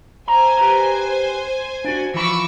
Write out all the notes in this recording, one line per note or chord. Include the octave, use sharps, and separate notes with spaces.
C5 G#5 A#5
G4 B4 A#5
D4 F#4
E3 F3 B5 C#6 D6 E6